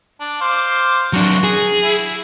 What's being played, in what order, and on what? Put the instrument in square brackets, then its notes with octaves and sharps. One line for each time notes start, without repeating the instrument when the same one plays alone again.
[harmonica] D4
C5 F5 D6
[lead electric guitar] F#3 D4 [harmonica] F#4
[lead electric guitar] G#4
[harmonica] E4